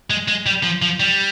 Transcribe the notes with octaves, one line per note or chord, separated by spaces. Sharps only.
G#3
G#3
G3
F3
F3
G3